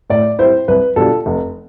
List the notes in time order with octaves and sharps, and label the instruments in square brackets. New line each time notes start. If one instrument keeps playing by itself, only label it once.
[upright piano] A2 D5
G3 C4 E4 C5
C2 B4
B2 G3 D4 F4 A4
F1